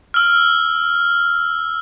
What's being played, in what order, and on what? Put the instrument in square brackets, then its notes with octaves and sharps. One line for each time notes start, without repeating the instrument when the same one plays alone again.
[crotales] E6 F6